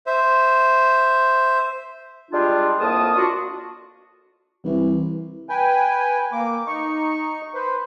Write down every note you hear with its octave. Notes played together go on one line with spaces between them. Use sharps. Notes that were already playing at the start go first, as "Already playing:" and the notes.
C5 E5
G3 G#3 D4 F4
F2 A2 A#3 A#4 A5 D#6
D4 F4 F#4
C2 E3
B4 G5 G#5
A#3 D6
D#4 C#6
B4 C5